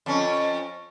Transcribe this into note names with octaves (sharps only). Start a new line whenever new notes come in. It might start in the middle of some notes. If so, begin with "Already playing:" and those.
F2 C#4